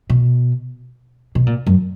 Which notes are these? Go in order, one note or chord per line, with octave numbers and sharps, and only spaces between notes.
B2
B2
A#2
F#2